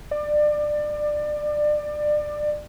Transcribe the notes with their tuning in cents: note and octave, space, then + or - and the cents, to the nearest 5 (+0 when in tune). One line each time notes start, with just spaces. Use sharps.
D5 +25